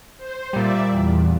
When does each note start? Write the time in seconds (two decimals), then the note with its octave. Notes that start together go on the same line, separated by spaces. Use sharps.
0.17 C5
0.53 A#2 G3 D5 E5
0.90 E2